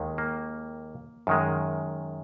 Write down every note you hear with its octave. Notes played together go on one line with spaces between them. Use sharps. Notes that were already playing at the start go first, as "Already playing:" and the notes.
Already playing: D#2 D#3 G#3
A#3
F#2 D#3 G#3